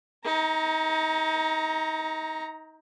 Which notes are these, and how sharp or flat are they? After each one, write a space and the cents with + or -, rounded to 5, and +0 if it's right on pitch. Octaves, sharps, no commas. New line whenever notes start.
D#4 +30 A#5 +0